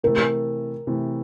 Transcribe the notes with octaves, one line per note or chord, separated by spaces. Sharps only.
C3 E3 A3 A#4
C3 E3 A3